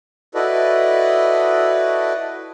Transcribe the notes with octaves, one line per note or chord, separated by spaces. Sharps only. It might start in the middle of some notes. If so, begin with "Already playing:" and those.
E4 F#4 A4 B4 D5 D#5